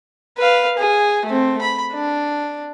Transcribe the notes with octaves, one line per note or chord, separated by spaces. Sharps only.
B4 F5
G#4
A3 C4
B5
D4